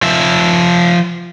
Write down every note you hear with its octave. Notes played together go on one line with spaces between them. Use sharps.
F3 E5